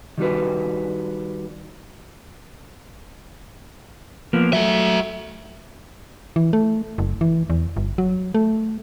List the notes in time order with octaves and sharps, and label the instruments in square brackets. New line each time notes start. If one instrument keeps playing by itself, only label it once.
[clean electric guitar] D#3 G3 F#4 B4
[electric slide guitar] F3 A#3 B3
[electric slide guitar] F#3 A3 [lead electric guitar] F#4 E5
[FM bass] E3
A3
F#1
E3
E2
G1
F#3
A3